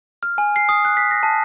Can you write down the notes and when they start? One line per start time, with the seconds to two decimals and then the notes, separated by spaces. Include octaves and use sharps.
0.23 F6
0.38 G#5
0.56 C7
0.69 D#6
0.85 F#6
0.97 B6
1.11 A#6
1.23 A5